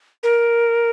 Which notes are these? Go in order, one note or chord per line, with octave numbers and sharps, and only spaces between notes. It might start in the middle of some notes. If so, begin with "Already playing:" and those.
A#4